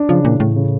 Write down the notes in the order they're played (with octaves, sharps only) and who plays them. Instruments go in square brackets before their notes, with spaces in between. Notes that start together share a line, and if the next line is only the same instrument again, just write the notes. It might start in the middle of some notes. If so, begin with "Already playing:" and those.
Already playing: [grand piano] D4
[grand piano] C#3 [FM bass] F3
[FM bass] A#2 [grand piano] E3
[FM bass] A2 [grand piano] A3
[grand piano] C#3